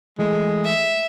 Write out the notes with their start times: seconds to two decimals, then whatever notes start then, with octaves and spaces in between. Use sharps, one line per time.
0.18 E3 G#3 A3
0.64 E5